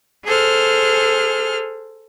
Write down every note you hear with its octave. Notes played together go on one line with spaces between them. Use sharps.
G#4 A4 C5 F6